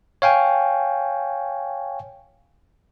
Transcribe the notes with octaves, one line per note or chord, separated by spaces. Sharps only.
C#5 F5 G5 G#5